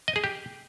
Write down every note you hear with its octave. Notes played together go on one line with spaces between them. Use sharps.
D#5
G#4
G4